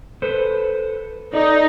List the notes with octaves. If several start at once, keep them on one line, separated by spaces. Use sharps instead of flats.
A4 B4 C5
D#4 A4 D5